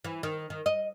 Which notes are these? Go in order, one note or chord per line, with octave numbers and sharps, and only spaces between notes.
E3
D#3
D#3
D#5